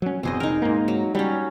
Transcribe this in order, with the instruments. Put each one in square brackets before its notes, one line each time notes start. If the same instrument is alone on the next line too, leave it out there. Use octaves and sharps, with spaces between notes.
[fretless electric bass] F#3 C#4
[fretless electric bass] G1 E2 B2 [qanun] C4 G#4 D#5
[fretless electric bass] E1 [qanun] D#4 A#4
[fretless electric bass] G#2 A#3
[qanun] F#3
[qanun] F#3 C#4 [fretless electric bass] G3